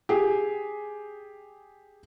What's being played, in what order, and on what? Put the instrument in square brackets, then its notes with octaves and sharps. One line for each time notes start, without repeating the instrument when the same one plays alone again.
[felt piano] G4 G#4